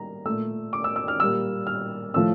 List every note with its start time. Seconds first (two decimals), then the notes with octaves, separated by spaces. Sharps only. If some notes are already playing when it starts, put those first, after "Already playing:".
Already playing: G3 A#3 A#5
0.26 A#2 A3 E6
0.73 D6
0.84 E6
0.96 E6
1.08 F6
1.20 A#2 G3 A#3 E6
1.67 F6
2.14 A2 F3 A3 E6